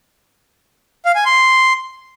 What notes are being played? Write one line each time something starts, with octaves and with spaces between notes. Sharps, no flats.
F5
G#5
C6